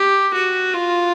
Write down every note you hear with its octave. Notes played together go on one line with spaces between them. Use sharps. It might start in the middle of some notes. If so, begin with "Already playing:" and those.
Already playing: G4
F#4
F4